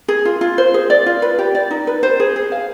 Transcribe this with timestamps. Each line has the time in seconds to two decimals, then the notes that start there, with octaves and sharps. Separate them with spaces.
0.08 G#4
0.25 F4
0.41 F4
0.58 C5
0.74 G#4
0.90 D5
1.06 F4
1.22 B4
1.39 G4
1.55 D5
1.71 D#4
1.87 B4
2.03 C5
2.20 G#4
2.36 G#4
2.52 F5